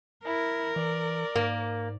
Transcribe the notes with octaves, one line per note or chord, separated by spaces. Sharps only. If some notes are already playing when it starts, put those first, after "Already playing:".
E4 A#4
E3 D5
G#2 A#3